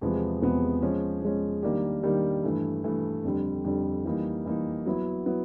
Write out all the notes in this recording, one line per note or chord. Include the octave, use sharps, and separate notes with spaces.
E2 C3 F3 G#3 B3
E2 C3 F3 G#3 B3
F3 G#3 C#4
F3 G#3 C#4
D#3 G3 A#3 D4 G4
D#3 G3 A#3 D4 G4
G2 E3 A3
G2 E3 A3
F2 D3 G3
F2 D3 G3
E3 G3 A#3 D#4
E3 G3 A#3 D#4
F#3 B3 E4
F#3 B3 E4